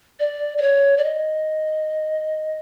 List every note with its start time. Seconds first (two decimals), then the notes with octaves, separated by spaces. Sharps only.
0.19 D5
0.58 D5
0.62 C#5
0.97 D5
1.04 D#5